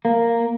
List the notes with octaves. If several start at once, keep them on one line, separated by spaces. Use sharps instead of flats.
A#3